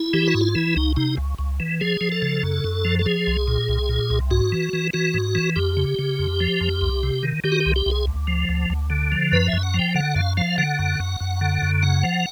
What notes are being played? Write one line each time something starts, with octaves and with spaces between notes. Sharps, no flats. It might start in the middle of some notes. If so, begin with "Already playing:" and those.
Already playing: E4
E3 G4
F#4
G#2
F4
E3 E4
C#2 D#4
C3 D#4
C#2
C#2
E3
F3 G#4
F3
A4
C#3
F#2
F#2
F3
A4
F3 G#4
C2
A#2
C2
A#2
C2
G#2 F#4
E3
E3
E3 F#4
G#2
E3
F2 G4
C#3
C#3
F2
F3
F2
C2
C3
D#3
D#3 G4
F#4
G4
C2
G4
C2
G#4
D2
F3
D2
D2
D3
F3
F#2 B4
E5
F#2
F#5
F3 G5
D3 F#5
F#2 F5
F3 F5
D3 F#5
F#2
F#2
F#2
D3
F#2
C#3 F#5
F3